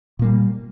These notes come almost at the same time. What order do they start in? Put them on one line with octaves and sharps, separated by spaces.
A#2 A#3 G3